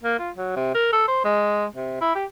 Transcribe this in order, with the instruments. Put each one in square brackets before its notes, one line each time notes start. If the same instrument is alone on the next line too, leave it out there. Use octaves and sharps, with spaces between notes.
[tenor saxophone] A#3
F4
F#3
C3
A#4
A4
C5
G#3
C3
E4
G4